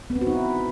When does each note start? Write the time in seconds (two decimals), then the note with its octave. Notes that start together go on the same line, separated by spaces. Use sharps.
0.10 B3
0.16 C4
0.21 F#4
0.27 D#4
0.33 E4